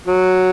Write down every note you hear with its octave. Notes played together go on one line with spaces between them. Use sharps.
F#3